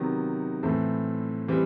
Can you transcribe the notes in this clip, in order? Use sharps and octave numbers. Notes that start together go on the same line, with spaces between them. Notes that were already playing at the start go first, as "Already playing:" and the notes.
Already playing: C3 D#3 F#3 B3
A2 E3 A3 C4
E3 G3 C4